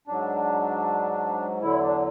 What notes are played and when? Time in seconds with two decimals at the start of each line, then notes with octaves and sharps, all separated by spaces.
0.07 G#2 F#3 D4
1.62 E2 D3 F#3 E4
1.81 D4